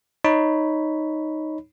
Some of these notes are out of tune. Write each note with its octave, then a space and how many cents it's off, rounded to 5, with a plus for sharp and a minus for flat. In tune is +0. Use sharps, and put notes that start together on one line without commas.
D#4 +0 C#5 +0 B5 +0